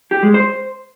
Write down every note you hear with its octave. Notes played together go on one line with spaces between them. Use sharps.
G4
G#3
C5